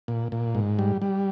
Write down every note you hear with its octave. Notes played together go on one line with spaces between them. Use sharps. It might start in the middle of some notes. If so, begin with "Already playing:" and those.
A#2
A#2
G#2
G3
G3